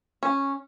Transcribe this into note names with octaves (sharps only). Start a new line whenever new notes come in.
C#4